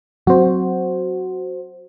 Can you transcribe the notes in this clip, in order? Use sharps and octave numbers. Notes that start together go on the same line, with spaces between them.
F#3 C4 F#4 C5